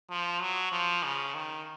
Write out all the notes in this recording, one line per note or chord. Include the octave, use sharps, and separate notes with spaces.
F3
F#3
F3
C#3
D#3